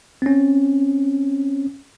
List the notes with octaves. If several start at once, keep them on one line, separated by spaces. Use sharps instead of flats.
C4 C#4